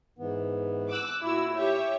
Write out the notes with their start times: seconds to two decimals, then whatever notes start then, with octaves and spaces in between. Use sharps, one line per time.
0.19 G#2 E3 B3
0.89 D6 E6 F#6
1.22 A#2 E4 F#4 E6
1.53 G4 C#5 E5